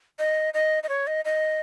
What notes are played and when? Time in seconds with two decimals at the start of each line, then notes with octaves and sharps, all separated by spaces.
0.19 D#5
0.54 D#5
0.83 D#5
0.89 C#5
1.07 D#5
1.25 D#5